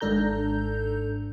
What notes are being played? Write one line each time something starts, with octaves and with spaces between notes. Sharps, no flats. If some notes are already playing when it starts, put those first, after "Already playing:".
G#1 G#2 D4 A4 A#5 G6